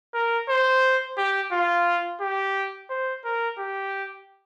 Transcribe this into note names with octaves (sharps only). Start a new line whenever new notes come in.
A#4
C5
G4
F4
G4
C5
A#4
G4